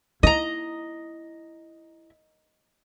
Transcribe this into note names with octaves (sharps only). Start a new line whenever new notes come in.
E4 D#5 A#5